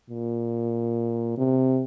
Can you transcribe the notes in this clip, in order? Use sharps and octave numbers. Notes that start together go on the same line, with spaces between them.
A#2
C3